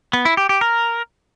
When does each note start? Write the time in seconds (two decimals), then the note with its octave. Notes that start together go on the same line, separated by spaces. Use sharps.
0.13 B3
0.25 E4
0.37 G4
0.49 G4
0.61 A#4